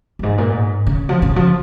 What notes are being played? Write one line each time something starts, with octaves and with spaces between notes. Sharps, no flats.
F#2
G#2
A#2
G#2
C#3
F3
C#3
F3